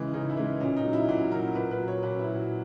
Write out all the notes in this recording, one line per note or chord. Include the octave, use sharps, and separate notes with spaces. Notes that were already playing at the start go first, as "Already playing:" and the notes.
Already playing: C#3 E3 G#3
C#3 D#4
E4
E3 G#3
A#2 C#4
D#4
F#3
E4
A#2 F#4
F#3 A#4
A#2 B4
B4
F#3
C#5
A#2 B4
E4
F#3
F#4